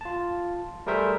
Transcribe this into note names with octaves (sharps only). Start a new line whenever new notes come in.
F4 A5
G3 A3 G#4 A#4 C5 E5